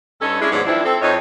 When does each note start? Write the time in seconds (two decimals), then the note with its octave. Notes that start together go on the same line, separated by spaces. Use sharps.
0.21 G2 C#4 D#4 A4
0.40 G#3 C#4 D4 E4
0.51 D#2 G#2 F3 F#3 B3 D5
0.67 E3 F3 C4 D4 E4
0.85 C4 A4
1.01 F2 D#4 C#5